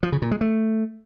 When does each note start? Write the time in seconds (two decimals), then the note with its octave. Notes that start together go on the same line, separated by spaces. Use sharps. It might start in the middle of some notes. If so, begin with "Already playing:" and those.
0.03 F3
0.12 C#3
0.22 A#2
0.31 G#3
0.41 A3